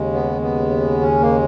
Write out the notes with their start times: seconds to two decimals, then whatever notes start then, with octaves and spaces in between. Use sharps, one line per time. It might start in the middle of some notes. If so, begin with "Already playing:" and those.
Already playing: D#2 C#3 G#3
0.13 B3
0.42 B3
1.01 C#4
1.21 A#3